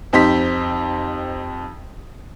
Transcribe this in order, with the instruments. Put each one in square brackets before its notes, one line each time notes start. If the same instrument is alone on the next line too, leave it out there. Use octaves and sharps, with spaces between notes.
[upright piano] F2 C4 D#4 G4 C6 B6